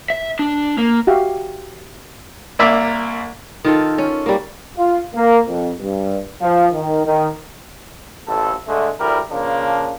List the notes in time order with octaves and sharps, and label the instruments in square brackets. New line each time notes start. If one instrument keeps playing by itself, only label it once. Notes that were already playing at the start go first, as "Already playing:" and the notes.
[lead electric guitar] E5
D4
A#3
[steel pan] F#4 G4 E5 F5
[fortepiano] C2 A#3 D5 E5 A#5
[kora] D#3 F4 A4
C#4
G3 A#3
[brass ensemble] F4
A#3
F2
G2
F3
D#3
D#3
[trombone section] A1 F2 A4
D3 G#3 A3
D2 G3 E4 A#4
C#3 F3 A#3 D4